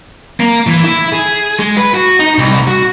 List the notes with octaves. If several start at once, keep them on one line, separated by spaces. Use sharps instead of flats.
A#3
E3
E4
G#4
G#3
B4
F#4
D#4
C2
F#4